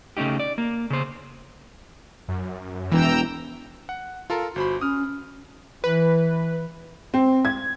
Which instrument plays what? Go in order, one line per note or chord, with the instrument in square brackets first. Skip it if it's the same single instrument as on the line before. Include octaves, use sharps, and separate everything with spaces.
[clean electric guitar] C#3 A3 C#4 D#4 G4
D5
A#3
C#3 C5
[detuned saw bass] F#2
[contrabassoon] E1 [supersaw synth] E3 [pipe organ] G5 A#5 E6
[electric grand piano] F#5
F4 A4 A#4
[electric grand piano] G1 C5 B5 [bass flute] F#4
[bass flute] C#4 [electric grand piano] D#6 F6
[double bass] E3 [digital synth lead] B4
[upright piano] C4
G#6